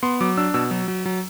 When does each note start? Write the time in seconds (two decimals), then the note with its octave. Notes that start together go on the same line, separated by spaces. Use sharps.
0.03 B3 C6
0.21 F#3 D6
0.37 D4 E6
0.54 B2 E6
0.71 F#3
0.88 F#3
1.06 F#3